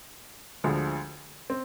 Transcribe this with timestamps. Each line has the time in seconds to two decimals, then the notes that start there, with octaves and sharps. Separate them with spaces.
0.64 D2 D3 F3 G#3
1.50 C4